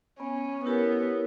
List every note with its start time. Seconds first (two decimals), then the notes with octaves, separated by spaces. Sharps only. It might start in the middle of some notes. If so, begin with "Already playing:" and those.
0.19 B3 C#4
0.65 B3 E4 G4 A#4 C#5